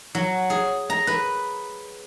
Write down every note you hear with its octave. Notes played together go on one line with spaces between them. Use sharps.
F#3
G#4
A#5
B4